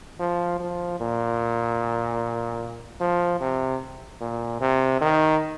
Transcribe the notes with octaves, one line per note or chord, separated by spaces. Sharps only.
F3
F3
A#2
F3
C3
A#2
C3
D#3